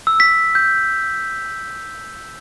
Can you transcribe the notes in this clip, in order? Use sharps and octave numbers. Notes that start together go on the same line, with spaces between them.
E6
B6
G6